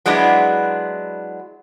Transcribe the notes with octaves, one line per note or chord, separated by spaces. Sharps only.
F#3 G#3 B3 D4 E4